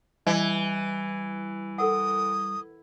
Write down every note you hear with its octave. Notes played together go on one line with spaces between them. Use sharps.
E3 G3 D#5
A4 A#4 F#5 D#6